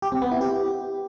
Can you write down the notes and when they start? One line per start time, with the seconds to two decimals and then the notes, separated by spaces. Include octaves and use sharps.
0.02 G4
0.12 C4
0.22 B3
0.31 E4
0.41 G4